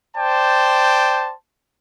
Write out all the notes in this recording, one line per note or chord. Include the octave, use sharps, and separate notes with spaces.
C5 D5 G5 A5